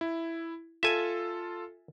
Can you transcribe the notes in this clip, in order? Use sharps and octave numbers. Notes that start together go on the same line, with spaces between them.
E4
F4 A4 E5 G#5